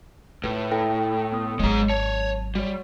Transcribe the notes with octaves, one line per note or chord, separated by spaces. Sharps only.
A2 F4 B4
E4 A4 G5
B3 D#6
G#1 F#3 G#3 C#5 A#5
C#5 A5
G3 F#4 C#5